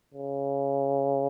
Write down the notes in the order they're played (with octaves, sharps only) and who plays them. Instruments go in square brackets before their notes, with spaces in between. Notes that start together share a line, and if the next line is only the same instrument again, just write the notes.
[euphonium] C#3